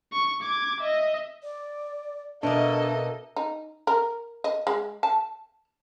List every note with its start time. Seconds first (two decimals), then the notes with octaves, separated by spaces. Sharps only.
0.13 C#6
0.42 D6 G#6
0.80 D#5 E5
1.43 D5
2.43 B2 A#3 D4 A4 D#5 E5
3.36 D#4
3.87 A#4
4.44 D#5
4.67 G#3
5.03 A5